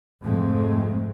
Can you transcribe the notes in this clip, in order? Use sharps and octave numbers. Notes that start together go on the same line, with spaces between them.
F1 F2 G#2 G#3 A3 C4